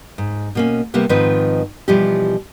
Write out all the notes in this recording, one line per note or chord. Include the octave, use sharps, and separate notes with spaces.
G#2
B2 A#3 C#4
C3 G3 A#3 B3
G#2 D#3 F3 C4 F4 B4
B2 E3 F3 G3 E4 G4